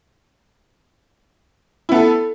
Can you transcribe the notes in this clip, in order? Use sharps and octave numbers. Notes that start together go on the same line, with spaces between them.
B3 E4 A4